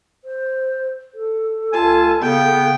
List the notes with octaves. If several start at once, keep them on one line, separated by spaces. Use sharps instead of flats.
C5
A4
C#2 F4 G#5 A5
C#3 B3 G5